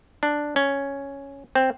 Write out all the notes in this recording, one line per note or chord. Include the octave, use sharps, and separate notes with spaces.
D4
C#4
C4